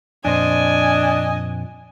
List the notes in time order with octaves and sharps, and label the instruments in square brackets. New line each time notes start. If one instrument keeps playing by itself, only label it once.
[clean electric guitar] F2 A#2 C5 [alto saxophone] D4 [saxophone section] D#5 [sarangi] G#5